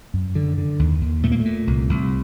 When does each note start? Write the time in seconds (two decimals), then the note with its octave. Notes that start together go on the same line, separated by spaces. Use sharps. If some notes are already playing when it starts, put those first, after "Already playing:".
0.14 F#2
0.35 D3
0.58 D3
0.79 D#2
1.02 D#2
1.23 A#2 A3
1.32 A#3
1.40 A3
1.45 A#2
1.67 C2
1.89 C2